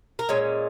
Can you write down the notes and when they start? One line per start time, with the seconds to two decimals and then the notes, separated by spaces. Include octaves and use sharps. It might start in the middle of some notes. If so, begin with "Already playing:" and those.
0.19 A#4
0.29 A#2 G#3 C#4 C#5